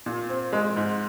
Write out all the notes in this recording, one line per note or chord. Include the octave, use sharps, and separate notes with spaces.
A#2
C4
G#3
G#2